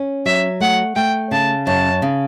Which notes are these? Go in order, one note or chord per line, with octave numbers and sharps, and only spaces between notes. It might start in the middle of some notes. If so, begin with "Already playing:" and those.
Already playing: C#4
F#3 E5
A3 F#5
A3 G5
C#3 A5
F#2 A5
C#3